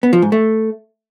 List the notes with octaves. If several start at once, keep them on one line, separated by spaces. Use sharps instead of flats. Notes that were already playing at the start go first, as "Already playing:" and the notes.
B3
F3
G#2
A3